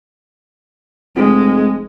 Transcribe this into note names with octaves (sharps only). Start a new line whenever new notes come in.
F1 G#3